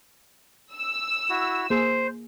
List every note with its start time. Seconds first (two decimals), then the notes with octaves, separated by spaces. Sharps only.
0.74 E6
1.30 E4 F#4
1.70 A#3 G#4 C5